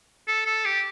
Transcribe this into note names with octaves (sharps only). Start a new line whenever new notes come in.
A4
A4
G4